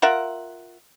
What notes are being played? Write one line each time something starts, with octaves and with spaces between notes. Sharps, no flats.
F4 A#4 E5 F#5